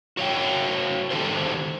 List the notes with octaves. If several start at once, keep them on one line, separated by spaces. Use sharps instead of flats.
F#4 C#5 F5 G5
D#3 G4 A4 C5